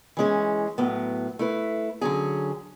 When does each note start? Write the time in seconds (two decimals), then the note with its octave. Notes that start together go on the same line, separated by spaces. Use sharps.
0.17 E3 G#3 C#4 G#4
0.78 A2 F#3 B3
1.39 A3 E4 B4
2.01 D3 F#3 C#4 G#4